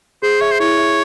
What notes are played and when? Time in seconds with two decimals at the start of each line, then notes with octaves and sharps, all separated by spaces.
0.22 G#4 C5
0.41 C#5 E5
0.51 C5
0.60 E4 C#5
0.78 E5